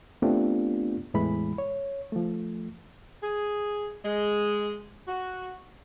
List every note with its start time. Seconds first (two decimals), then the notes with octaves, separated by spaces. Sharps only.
0.22 A3 B3 C4 D4 F4 G4
1.14 E2 A2 E3 G#3 B5
1.58 C#5
2.12 F3 A3
3.23 G#4
4.05 G#3
5.08 F#4